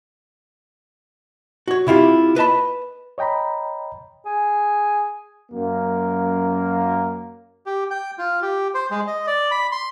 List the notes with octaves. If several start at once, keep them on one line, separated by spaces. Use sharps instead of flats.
F#4 C#5
C3 E4 F4 G4
B4 D#5 A5 B5
C#5 D#5 G5 A#5 B5
G#4
F#2 A#3
G4
G5
F4
G4
C5
G#3
D#5
D5
B5
C6